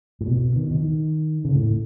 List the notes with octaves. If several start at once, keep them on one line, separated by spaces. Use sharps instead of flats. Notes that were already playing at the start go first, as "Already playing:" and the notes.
A2
B2
D#3
D#3
C#3
A2